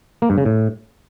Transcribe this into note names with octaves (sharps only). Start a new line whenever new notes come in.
A#3
G2
C#3
A2